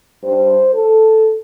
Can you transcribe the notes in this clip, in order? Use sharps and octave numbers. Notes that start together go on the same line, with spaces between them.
G2 G3 D4 C5
A4